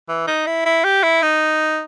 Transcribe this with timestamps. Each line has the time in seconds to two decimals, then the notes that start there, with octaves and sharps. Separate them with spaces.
0.08 E3
0.27 D#4
0.47 E4
0.66 E4
0.84 G4
1.03 E4
1.22 D#4